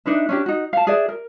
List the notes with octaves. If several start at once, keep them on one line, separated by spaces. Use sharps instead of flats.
D4 D#4 B4 E5
C#4 D4 G4
D#4 F#4
F5 A5
G#4 B4 D5 E5
A#4